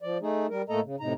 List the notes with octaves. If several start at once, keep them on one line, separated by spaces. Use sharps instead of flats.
F3 D5
A3 D#4 G#4
G3 A#4
A2 A3 A#3 A4 D#5 A#5
C#3
A2 C3 D#4 A#5